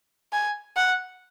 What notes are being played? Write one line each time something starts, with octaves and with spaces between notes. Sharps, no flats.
G#5
F#5